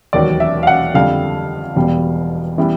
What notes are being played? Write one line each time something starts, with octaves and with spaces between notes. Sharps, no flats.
E1 D#2 D#3 F#3 D5
E5
F5
F#5
F2 D3 G3 F5
E1 E2 B2 G3
E3 G3 B3